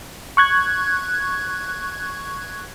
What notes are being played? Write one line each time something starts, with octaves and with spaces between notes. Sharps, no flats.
C#6 F#6 G#6